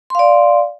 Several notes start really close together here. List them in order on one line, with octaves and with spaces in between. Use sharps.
C6 F5 D5